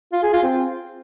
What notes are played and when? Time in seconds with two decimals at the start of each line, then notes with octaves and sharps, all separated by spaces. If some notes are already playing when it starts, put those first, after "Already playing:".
0.13 F4
0.23 G#4
0.33 F4
0.43 C4